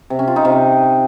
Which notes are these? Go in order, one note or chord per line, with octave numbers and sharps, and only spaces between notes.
C3
C#4
F4
D#4
C3